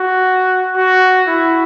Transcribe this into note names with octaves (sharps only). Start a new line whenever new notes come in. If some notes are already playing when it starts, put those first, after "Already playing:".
Already playing: F#4
F#4
E4